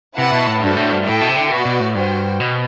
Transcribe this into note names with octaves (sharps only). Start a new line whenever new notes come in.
C3 E4 B4 F#5 A5
B2
A2
G2 A3 D4 F#4 A4 C5
A2
G2
A2 E4 A4 E5 G5
B2
C3
D3
B2 F#4 B4 D5
B2
A2
G2 F#4 C5 G5
B2